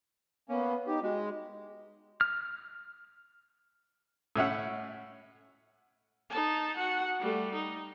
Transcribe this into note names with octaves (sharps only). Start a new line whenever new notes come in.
A#3 B3 C#4
D#4 G4
G#3 F#4
F6
A2 C#4 E5 F#5
D#4 A5
F#4 F#5
G3 A3
D#4